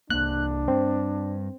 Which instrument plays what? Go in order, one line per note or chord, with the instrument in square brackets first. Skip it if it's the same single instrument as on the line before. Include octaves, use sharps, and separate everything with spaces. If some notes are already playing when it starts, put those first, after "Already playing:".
[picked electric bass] C2 A#3 [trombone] D4 [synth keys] F#6
[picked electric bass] G2 [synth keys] C4